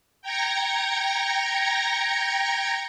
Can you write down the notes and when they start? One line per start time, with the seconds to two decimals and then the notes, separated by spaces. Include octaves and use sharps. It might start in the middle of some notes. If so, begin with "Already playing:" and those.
0.22 G5 A#5 G#6 A#6 C#7